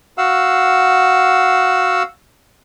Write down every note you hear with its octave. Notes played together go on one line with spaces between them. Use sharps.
F#4 F5 F#5 E6